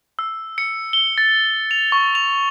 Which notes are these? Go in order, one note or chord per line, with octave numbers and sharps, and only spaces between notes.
E6
C#7
G7
A6
F7
C#6
F7